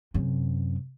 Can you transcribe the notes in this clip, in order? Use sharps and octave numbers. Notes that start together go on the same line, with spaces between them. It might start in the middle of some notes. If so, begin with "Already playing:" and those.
F#2 C3